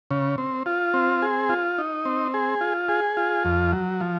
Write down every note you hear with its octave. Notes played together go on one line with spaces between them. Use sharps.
C#3
C4
F4
C4
G#4
F4
D#4
C4
G#4
F4
G#4
F4
F2
F#3
F3